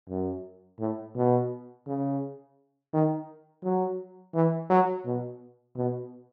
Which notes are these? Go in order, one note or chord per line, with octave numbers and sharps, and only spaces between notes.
F#2
A2
B2
C#3
D#3
F#3
E3
F#3
B2
B2